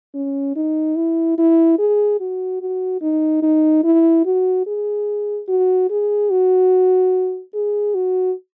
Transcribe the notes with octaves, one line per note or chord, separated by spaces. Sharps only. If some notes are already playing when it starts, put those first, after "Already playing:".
C#4
D#4
E4
E4
G#4
F#4
F#4
D#4
D#4
E4
F#4
G#4
F#4
G#4
F#4
G#4
F#4